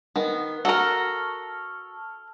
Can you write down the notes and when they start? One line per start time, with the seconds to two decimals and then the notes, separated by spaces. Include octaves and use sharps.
0.16 D#3 B3
0.65 F#4 A4 A#4 A5 A#5 C#6 F6